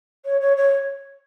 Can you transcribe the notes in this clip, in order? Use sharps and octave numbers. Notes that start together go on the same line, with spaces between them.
C#5
C#5
C#5